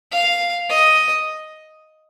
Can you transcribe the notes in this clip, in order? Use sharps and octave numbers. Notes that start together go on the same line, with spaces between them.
F5
D#5